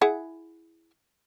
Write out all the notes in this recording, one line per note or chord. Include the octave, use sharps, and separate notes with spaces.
E4 G#4 F#5